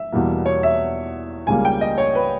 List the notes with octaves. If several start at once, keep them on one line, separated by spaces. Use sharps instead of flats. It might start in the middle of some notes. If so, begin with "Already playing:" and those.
Already playing: E5
E2 B2 G3 A#3
C#5
E5
C#2 C#3 G3 A#3 G#5
G5
D#5
C#5
B4